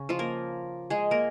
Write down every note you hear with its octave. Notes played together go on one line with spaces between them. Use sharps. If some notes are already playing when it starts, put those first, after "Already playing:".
Already playing: C#3 C#4
F3 F4
A#3 A#4
G#3 G#4
A#3 A#4